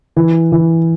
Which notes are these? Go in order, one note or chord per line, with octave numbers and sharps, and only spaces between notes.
E3
E3